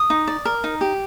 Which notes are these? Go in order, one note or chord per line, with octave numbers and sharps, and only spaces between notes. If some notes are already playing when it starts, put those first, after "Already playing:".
Already playing: D#6
D#4
D5
A#4
D#4
G4